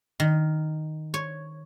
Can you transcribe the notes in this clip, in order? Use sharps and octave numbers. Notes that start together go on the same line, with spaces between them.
D#3
C#5